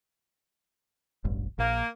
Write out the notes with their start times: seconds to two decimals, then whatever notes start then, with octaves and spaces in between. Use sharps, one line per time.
1.25 E1 A1 G2
1.58 A#1 A#3